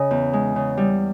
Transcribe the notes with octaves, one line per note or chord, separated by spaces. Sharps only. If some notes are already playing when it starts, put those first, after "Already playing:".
Already playing: C#3 D#5
E2
G#3
C#3
G3